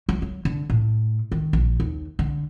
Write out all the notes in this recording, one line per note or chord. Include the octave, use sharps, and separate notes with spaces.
F#3
F#3
D3
A2
D#3
A#1
D#2
D3